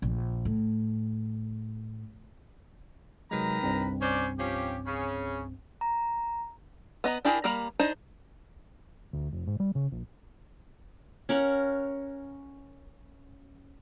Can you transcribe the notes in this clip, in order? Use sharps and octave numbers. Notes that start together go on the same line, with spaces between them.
A#1
A2
C3 D#3 F#3 G#3 B4 A#5
C2 G2 C4
C#4 C5 D5
F3 C#4 G4
C#3 C#4
A#5
B3 D#5 A#5
D4 E4 G4 G#4 A#4
G3 A#3 A#4 A#5 B5
D4 D#4 C5 D#5
D2
F1
G#2
G3
C#3
A#1
C#4 A#4 F#5